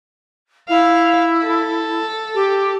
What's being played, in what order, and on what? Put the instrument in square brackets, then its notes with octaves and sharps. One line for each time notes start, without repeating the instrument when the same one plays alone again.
[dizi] E4 [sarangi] F5
[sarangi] A4
[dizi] G4